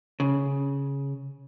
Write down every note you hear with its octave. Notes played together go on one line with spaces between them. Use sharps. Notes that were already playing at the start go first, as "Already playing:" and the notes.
C#3